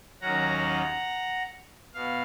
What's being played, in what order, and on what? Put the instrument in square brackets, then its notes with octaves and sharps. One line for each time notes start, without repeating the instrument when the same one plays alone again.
[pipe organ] D#2 D#3 F#3 C#4 F#5 A#5
B2 F5